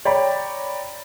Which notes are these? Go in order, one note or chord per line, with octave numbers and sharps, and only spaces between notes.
C#5 D5 G5 A#5 B5